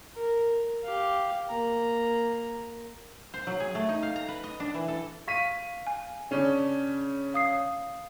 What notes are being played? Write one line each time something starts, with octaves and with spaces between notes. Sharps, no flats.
A#4
G4 F5
A#3 A#5
C5
F#3
G#4
A3
D#4
F5
A#5
B4
D#5
D4
E3
A4
F5 C#6 B6 D#7
G#5
C#3 C#4 D4
F5 D#6 C7